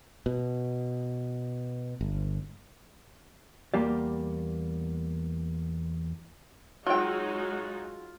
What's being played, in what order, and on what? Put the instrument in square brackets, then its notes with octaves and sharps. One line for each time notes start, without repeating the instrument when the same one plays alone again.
[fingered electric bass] B2
G1
[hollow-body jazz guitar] E2 G3 A#3 G4 D5
[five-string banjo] F#3 G5 [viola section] G#3 D#4 F#4 [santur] F4 E6